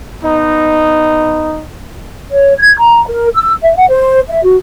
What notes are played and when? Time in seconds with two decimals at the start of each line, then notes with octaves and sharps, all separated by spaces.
0.22 B3 D#4
2.30 C#5
2.59 G#6
2.78 A#5
3.07 A#4
3.35 E6
3.62 E5
3.76 F#5
3.89 C5
4.29 E5
4.43 F#4